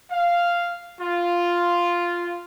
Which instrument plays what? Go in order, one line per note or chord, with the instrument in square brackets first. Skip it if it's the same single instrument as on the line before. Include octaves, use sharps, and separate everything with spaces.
[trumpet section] F5
F4